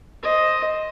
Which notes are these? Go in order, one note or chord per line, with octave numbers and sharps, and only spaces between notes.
C5 D#5